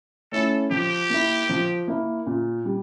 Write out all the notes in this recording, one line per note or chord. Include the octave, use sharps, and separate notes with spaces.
A3 C#4 E4 A4
F3 G4
A#3 E4
F3
A#3 E4
A#2
G3